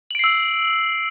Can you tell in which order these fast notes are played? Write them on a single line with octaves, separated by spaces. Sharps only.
F#7 D7 C7 E6